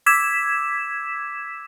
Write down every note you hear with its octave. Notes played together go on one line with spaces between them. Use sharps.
D6 E6 G#6 B6 E7